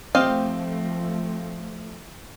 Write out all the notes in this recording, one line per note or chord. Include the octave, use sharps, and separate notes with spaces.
F3 A3 C4 G4 D#5 F5